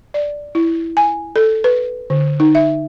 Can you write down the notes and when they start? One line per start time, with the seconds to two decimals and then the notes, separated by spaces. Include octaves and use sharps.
0.14 D5
0.55 E4
0.97 G#5
1.36 A4
1.64 B4
2.10 D3
2.40 D#4
2.55 E5